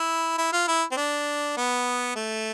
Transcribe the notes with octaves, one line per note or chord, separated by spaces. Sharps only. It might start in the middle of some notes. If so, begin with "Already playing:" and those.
Already playing: E4
E4
F4
E4
C4
D4
B3
A3